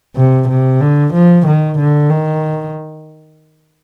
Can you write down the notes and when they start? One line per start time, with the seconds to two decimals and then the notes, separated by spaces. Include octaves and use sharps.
0.16 C3
0.48 C3
0.81 D3
1.13 F3
1.47 D#3
1.78 D3
2.10 D#3